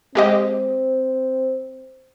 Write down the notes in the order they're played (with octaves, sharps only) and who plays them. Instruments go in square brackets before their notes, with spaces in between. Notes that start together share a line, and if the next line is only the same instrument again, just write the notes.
[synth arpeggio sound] G#3 G4 D#5 [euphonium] C4